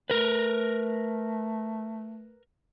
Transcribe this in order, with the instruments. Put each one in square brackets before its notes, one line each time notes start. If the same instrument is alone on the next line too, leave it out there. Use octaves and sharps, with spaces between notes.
[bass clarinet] A3 [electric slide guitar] A#4 B4